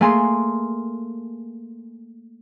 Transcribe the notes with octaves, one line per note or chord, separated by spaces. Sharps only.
A3 A#3 G#4 G#5 C6